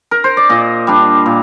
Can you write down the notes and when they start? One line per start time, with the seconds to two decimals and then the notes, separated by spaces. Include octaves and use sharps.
0.11 A#4
0.24 C5
0.37 D5
0.49 A#2 D#5
0.87 G3 D4
1.26 A#2